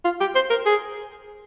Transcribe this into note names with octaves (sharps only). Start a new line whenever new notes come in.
F4
G4
C5
A#4
G#4